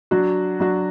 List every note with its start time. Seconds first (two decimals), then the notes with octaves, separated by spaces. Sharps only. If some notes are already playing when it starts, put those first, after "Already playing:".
0.11 F#3 D4 F#4
0.60 F#3 D4 F#4